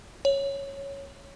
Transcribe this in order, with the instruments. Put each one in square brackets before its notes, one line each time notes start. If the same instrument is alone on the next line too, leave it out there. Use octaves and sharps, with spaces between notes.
[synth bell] C#5